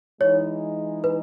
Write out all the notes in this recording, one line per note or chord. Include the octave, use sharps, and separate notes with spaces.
E3 G#3 D#4 C#5
B4